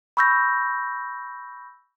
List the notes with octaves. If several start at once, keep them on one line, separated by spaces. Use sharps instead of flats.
B5 C#6 E6 G6 A#6